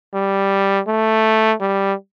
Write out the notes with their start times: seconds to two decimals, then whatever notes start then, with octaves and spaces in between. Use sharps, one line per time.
0.14 G3
0.88 A3
1.61 G3